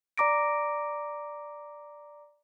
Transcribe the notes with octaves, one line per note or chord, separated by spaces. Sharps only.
D5 A#5 D6 A#6 D7